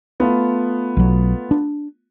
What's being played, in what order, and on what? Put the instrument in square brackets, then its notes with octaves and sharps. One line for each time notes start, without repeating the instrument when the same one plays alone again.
[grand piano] A3 B3 F4
[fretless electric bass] B1 F#3
D4